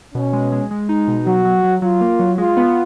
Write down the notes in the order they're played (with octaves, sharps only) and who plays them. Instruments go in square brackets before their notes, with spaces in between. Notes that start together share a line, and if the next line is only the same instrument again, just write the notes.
[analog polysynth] B2 [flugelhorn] C#4
[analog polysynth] G#3
G#3
G#3
D#4
B2
[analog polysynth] F#3 [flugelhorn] F#4
[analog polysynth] F#3
F#3
[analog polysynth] F#3 [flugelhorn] F4
[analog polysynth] A#3
F#3
[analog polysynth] G#3 [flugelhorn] F4
[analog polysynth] B3